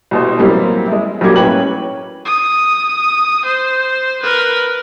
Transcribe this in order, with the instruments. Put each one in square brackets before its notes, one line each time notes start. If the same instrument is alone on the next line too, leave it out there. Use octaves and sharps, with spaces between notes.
[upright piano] C2 B2 C5
A2 C3 E3 F#3 G3 A#3
G#3 E4
B1 F#3 G3 A#3 D6 G#6
A2 C#4 B4 G5 F#7
[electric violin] D#6
C5
A#4 B4